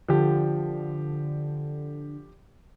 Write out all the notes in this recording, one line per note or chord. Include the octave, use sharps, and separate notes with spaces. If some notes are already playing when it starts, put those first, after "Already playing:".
D3 F3 G4